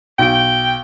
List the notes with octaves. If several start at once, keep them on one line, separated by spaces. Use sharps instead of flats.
B1 G5